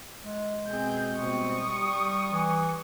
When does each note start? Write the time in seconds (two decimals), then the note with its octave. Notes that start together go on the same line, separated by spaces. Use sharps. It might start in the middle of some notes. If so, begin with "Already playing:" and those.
0.22 G#3
0.68 B2 C4 G#4 G6
1.17 B2 G3 C4 C#6 D#6
1.68 G3
2.32 E3